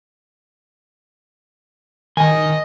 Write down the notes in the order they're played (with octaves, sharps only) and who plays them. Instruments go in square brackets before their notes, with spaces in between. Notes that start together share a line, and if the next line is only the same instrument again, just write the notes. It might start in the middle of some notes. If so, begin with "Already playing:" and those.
[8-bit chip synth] D#3 [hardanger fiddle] D#5 [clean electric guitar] G#5